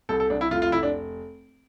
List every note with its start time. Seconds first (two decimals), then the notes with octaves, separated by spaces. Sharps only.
0.09 C2 A4
0.20 A4
0.30 C2 D4
0.41 E4
0.51 F1 F4
0.62 F4
0.72 F1 E4
0.83 D4